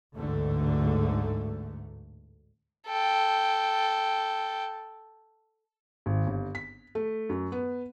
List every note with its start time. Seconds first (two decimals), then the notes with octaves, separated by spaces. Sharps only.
0.17 A1 D2 G#2 D3 A3
2.88 A4 G5
6.06 G#1
6.27 G1
6.55 B6
6.95 A3
7.29 F#2
7.52 B3